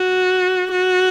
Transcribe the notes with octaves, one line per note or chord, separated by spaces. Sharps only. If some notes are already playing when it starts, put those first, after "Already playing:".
Already playing: F#4
F#4